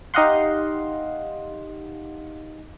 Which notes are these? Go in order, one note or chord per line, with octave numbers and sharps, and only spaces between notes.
D#4 G4 D#5 F5 F#5 C6